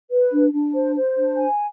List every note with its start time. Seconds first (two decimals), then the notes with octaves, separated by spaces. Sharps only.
0.10 B4
0.31 D4
0.53 D4
0.75 C5
0.95 C5
1.17 D4
1.39 G#5